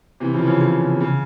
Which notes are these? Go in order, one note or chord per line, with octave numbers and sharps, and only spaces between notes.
C3 E3
C#3 F3
E3
C#3 F3
C#3
C#3
C3
C#3